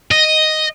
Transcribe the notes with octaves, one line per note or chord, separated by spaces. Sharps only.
D#5